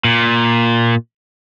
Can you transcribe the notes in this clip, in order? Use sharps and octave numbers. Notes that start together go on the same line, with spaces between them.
A#2